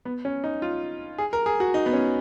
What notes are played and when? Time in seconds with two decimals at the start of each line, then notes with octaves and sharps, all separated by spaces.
0.05 B3
0.25 C#4
0.44 D#4
0.62 F4
1.18 G#4
1.33 A#4
1.46 G#4
1.60 F#4
1.74 D#4
1.86 B3
1.93 C#4